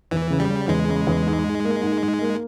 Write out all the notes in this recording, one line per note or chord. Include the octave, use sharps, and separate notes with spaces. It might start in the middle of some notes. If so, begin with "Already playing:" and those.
E2 E3
C#3
G3
C#3
E2 G#3
C#3
E2
G#2
G#2
A#3
G#2
G#2
A#3